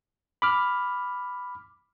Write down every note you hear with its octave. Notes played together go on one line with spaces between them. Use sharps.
B5 D6 F6